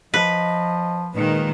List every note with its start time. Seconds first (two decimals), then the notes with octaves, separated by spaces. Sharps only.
0.14 F3 B4 D#5
1.14 A#2 D#3 G#3 B4